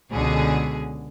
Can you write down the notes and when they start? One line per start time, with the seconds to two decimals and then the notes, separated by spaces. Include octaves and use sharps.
0.12 C#2 B2 D3 G#4